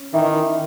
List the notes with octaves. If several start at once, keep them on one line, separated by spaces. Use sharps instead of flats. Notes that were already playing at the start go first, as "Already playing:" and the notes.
Already playing: C#4
D#3 E3